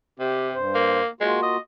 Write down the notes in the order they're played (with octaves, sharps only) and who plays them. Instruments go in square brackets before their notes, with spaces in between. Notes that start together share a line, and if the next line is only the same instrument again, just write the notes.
[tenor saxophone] C3 [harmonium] G4
[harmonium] G2 C5
[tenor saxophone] A#3
[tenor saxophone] G#3 [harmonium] A#3 F4 F#4
[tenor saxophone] D#5